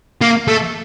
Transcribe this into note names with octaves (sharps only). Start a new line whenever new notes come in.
A#3
A3